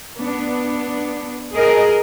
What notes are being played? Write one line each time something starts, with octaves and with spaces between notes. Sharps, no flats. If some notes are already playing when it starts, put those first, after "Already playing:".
B3 D4
G#4 A#4 D#5